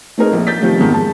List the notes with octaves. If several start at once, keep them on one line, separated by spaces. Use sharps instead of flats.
A3 C4 D#4 G#4 A#4
A#1 A#2
G6 A6 B6
C3 D#3 F3 G3 A3
F2 G#2 B2 D#3
G#3 A5